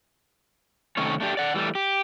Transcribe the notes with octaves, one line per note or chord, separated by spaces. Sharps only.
C3 D#3 A3 C#4 C#5
A3 D4 G4
D5 F#5
E3 G3 A3
G4